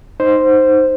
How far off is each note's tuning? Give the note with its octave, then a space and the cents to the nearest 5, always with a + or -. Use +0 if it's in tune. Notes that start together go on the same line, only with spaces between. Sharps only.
D#4 +0 C5 +0